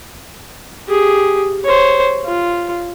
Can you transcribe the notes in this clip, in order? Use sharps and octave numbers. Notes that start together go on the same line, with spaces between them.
G4 G#4
C5 C#5
F4